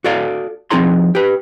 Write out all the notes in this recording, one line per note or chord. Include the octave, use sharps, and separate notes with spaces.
F#4 A4 D5 F5
F3 C4 D#4 G#4 A#5 C6
G4 B4